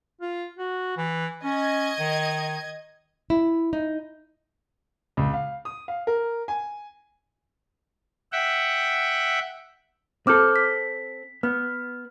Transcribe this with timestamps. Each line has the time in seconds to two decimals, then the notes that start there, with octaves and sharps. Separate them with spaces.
0.21 F4
0.58 F#4
0.97 E3
1.44 C#4 D#5 G#6
1.99 D#3
3.30 E4
3.73 D#4
5.17 C#2
5.34 F5
5.65 D#6
5.88 F5
6.07 A#4
6.48 G#5
8.32 E5 F#5 G5
10.27 C4 A4 D6 F6 G6
10.56 B6
11.43 B3 F6